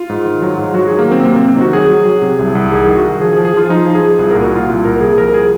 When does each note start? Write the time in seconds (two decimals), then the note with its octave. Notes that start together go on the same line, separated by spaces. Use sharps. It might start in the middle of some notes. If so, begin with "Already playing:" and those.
Already playing: F4
0.09 G#2
0.25 D#3
0.42 F#3
0.58 G#2
0.74 F#3 F#4
0.87 D#3 G#4
0.99 A#3
1.08 F#3 C4
1.23 C3 A#3
1.36 C4
1.40 C3
1.48 C4
1.56 D#3 F#4
1.73 F#3 G#4
1.89 F#3
2.05 F#3
2.22 C3
2.39 C2
2.55 C2
2.72 D#3 G#4
2.87 D#3
2.95 F#4
3.05 D#3
3.21 F3 G#4
3.33 G#4
3.37 F3
3.45 G#4
3.54 F3 F4
3.69 F3 D#4
3.86 F3
3.95 G#4
4.02 F3
4.19 C2 G#4
4.31 A#2 A#4
4.43 F#4
4.51 A#2 F4
4.68 C2
4.85 A#2 A#4
5.00 C2 G#4
5.18 F3 A#4
5.34 G#4